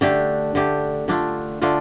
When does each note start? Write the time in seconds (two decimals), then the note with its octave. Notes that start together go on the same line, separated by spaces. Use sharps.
0.01 D3 A3 D4 G4
0.55 D3 A3 D4 G4
1.08 D3 A3 D4 F4
1.61 D3 A3 D4 F4